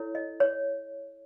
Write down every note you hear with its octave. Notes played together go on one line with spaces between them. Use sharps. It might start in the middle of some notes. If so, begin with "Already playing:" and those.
Already playing: E4 A4 C#5
D#5
C#5